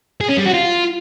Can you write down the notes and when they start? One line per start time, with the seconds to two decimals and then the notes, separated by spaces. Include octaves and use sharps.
0.21 G#4
0.29 C#4
0.38 G3
0.46 F#4
0.54 F4